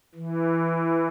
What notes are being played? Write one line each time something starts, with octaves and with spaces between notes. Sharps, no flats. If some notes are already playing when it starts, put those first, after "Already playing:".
E3